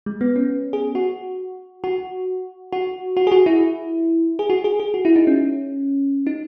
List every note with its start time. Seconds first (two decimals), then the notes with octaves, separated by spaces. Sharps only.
0.06 G#3
0.21 B3
0.36 C#4
0.73 G#4
0.95 F#4
1.84 F#4
2.73 F#4
3.17 F#4
3.27 G#4
3.32 F#4
3.46 E4
4.39 G#4
4.50 F#4
4.64 G#4
4.80 G#4
4.94 F#4
5.05 E4
5.16 D#4
5.27 C#4
6.27 D#4